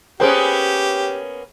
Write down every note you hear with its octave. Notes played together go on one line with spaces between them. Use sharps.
A#3 B3 C#4 G4 G#4 C5 G5